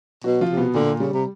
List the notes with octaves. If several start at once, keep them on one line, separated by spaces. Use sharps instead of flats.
B2 F#3 F#4
F3 F4
C3
B2 B3
A#2 D3 A#3
C#3 G3
C3